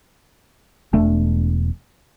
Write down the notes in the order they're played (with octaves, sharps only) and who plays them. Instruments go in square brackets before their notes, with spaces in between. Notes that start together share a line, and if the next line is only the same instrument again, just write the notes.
[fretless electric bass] E1 A3 D4